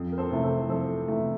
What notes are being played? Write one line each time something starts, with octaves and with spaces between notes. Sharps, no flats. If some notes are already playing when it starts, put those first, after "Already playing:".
Already playing: F2
A#4
A4 C5
C3 E3 A3 E4
A4 C5
F2 A4 C5
C3 E3 A3 E4